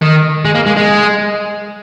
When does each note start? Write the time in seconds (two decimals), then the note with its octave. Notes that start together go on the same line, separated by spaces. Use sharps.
0.02 D#3
0.45 G#3
0.55 A#3
0.66 G#3
0.77 G#3